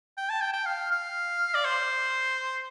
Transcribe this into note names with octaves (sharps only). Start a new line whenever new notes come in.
G5
A5
G5
G5
F5
F5
D5
C5